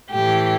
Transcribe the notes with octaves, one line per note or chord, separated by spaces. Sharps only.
A2 E3 G4